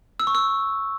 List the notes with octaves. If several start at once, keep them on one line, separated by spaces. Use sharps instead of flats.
E6
C#6
E6